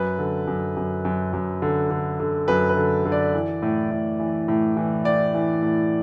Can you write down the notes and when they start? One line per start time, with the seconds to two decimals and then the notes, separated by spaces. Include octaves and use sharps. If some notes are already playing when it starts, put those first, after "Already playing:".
Already playing: F#2 B4
0.19 D3
0.47 F#2
0.76 F#2
1.05 F#2
1.33 F#2
1.62 D3
1.91 D3
2.20 D3
2.48 F#2 B4
2.69 B4
2.77 D3
3.05 D3
3.12 D5
3.34 E3
3.62 A2
3.91 A2
4.19 E3
4.48 A2
4.77 E3
5.05 A2 D5
5.34 E3
5.62 A2